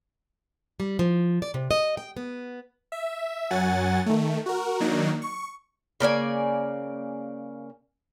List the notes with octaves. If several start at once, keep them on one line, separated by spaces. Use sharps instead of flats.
G3
F3
D5
C3
D#5
G5
B3
E5
F#2 F#3 F#5 G#5 A6
D#3 A3
F#4 A#4
D#3 F#3 A#3 D4 D#4
C#6
C#3 A#3 D5 G#5